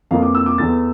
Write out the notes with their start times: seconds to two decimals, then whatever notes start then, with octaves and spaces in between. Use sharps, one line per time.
0.11 F2 E3 A#3 F5
0.23 D6
0.35 E6
0.46 D6
0.58 E2 E3 A3 A6